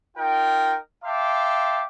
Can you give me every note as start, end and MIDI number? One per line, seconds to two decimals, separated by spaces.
0.17 0.76 63
0.17 0.76 65
0.17 0.76 70
0.17 0.76 79
1.04 1.85 76
1.04 1.85 77
1.04 1.85 79
1.04 1.85 81
1.04 1.85 84
1.04 1.85 86